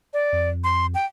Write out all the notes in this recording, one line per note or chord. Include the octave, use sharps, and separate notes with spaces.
D5
F2
C6
G5